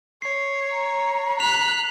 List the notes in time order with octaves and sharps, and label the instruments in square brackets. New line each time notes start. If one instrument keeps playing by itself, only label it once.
[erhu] C#5 [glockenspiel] C7
[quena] A#5
[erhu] F#6 [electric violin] B6 [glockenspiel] F7